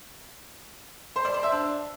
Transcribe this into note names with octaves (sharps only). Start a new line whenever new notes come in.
C5
D5
C5
E5
D4